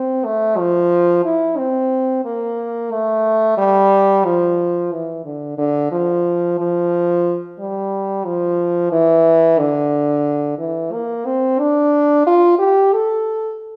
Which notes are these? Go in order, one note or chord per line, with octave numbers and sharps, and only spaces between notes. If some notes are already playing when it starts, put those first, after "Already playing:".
Already playing: C4
A3
F3
E4
C4
A#3
A3
G3
F3
E3
D3
D3
F3
F3
G3
F3
E3
D3
E3
A#3
C4
D4
F4
G4
A4